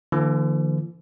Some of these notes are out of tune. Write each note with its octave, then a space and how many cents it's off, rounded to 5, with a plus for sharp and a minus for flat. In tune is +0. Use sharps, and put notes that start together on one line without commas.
D3 +25 F3 -45 A#3 +0